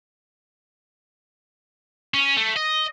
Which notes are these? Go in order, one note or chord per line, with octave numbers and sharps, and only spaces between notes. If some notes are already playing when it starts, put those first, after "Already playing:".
C#4
A3
D#5